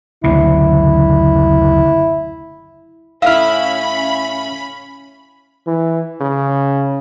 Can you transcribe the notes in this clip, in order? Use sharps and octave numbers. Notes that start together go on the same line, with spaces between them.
F#1 D2 C3 E4
A2 A3 C#4 E4 E5 F5 B5 F6
E3
C#3